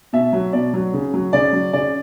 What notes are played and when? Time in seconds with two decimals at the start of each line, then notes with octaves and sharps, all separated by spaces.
0.13 B2 E5
0.33 F#3
0.53 B2 D5
0.74 F#3
0.94 C#3
1.14 F#3
1.33 C#3 D5
1.53 F#3
1.73 C#3 D5